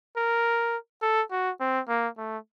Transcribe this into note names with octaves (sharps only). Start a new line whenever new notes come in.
A#4
A4
F#4
C4
A#3
A3